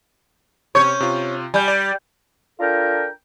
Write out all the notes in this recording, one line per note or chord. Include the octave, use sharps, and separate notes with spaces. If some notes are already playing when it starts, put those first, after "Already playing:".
C3 C#4 C#5 C#6 G6
C3 F4
G3 G#5 B5 G6
D5
D4 F4 A4 A#4 G5 A#5